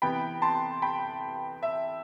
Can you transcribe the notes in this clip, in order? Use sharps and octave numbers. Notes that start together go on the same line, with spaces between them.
C3 E3 B3 G5 B5
A5 C6
G5 B5
E5